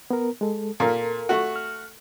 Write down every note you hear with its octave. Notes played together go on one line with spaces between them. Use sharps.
B3 A#4
G#3 A4
A#2 A4 A#4
A3 F#4
F6